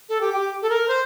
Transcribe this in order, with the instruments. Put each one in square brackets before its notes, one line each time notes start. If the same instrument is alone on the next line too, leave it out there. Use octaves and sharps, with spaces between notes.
[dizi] A4
G4
G4
A4
A#4
C5